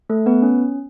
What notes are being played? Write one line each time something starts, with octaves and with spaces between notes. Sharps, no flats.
A3 A4
B3 B4
C#4